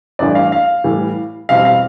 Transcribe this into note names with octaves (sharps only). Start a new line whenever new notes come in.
A1 G2 E3 D5
F5
F5
A2 E3 G3
E2 B2 G3 C4 E4 F5
F5